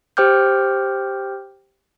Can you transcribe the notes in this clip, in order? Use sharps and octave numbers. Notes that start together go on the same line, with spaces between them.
G4 C5 G5 D6 F6 G6